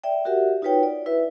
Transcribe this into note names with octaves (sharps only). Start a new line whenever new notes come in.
D5 E5 G5
F#4 G4 A#4 E5 F#5
D#4 F4 F#4 B4 C#5 G5
D5
E4 B4 E5